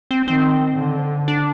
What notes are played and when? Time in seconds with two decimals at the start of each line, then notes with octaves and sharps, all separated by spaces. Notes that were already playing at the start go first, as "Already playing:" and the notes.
0.11 C4
0.26 D#3 C4
0.77 D3
1.28 D4